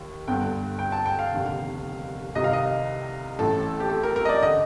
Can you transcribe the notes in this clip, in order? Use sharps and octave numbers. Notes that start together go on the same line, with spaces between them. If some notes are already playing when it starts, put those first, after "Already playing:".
Already playing: D#2
G1 G2 D3 G5
G5
A5
G5
F5
F1 D#2 D3
C2 C3 D#3 D#5
F5
D#5
A1 A2 A4
G4
A4
A#4
A#4
D#5
D5
D3 D#5